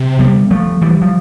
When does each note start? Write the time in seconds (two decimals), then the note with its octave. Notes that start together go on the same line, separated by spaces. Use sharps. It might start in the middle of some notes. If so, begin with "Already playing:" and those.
Already playing: C3
0.19 G3 B3
0.51 F3 A3
0.81 E3 G3
1.01 F3